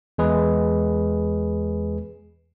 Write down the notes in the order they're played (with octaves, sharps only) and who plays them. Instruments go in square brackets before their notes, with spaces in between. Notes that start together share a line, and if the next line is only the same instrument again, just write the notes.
[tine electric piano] E2 G#3 G#4 B4